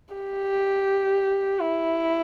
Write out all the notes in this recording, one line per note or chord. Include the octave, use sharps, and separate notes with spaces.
G4
E4